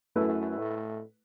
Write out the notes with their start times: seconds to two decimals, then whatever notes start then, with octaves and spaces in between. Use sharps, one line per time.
0.16 F#2 A3 E4 B4
0.58 A2